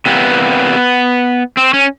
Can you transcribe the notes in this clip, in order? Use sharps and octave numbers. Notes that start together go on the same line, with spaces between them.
C3 E3 G3 A#3 B3
C4
C#4